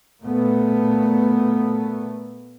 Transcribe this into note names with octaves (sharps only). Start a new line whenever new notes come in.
A#2 A3 B3